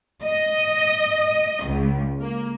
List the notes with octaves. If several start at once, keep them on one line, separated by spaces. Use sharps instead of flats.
D#5
C#2
A#3